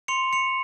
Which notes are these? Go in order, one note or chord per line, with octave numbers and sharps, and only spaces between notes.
C6 C#7 F7
C6 C#7 F7